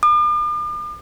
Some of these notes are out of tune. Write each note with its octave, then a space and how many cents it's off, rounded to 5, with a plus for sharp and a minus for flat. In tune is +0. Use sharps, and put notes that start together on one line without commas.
D6 +45